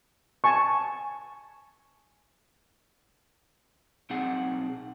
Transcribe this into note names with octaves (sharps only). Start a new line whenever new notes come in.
G#5 A5 C#6
B1 C4 D#4 G#4 F#5